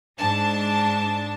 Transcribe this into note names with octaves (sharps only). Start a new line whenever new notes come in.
G#2 D4 A5